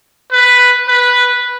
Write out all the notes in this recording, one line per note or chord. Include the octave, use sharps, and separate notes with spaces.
B4
B4